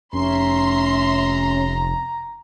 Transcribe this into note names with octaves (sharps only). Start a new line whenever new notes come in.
F1 C#4 E5 A#5 C6